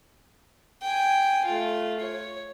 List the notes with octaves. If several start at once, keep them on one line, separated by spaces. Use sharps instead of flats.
G5 G#5
A3 F4
C#5